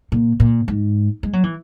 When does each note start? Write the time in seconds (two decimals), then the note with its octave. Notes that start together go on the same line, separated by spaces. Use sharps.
0.12 A#2
0.40 A#2
0.68 G#2
1.23 G#3
1.33 F#3
1.44 E3